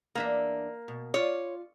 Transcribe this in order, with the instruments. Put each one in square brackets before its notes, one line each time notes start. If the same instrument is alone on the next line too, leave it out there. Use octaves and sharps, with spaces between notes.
[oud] E2 D4 E5 [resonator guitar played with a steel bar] A#3
[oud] B2
[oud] F4 D5 [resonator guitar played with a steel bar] C#5